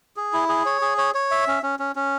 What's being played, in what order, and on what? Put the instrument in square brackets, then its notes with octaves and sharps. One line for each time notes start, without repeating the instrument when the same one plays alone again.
[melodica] G#4
E4
G#4
C#5
G#4
C#5
C#5
E5
C#4
C#4
C#4
C#4